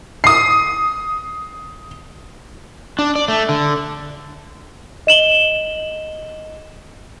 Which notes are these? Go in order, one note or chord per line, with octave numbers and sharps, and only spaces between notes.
D#6 C7
D4
D5
A3
D3
D#5 E7 F#7 G7